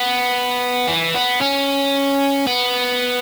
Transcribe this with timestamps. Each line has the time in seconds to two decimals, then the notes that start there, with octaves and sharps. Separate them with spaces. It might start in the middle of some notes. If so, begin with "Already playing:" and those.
Already playing: B3
0.87 E3
1.14 B3
1.41 C#4
2.47 B3